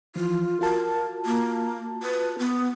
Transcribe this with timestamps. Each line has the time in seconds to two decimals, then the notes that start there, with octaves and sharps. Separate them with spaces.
0.16 E3 F3 F4
0.61 F4 F#4 A#4 A5
1.25 A#3
2.03 B4
2.39 B3